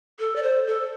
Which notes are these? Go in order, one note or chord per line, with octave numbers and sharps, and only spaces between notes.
A4
D5
C5
A4